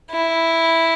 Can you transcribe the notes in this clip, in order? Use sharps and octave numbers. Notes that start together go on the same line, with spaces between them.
E4